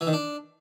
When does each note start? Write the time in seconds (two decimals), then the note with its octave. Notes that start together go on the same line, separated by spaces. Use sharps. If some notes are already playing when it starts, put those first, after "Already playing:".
0.01 E3
0.07 D#3
0.13 D4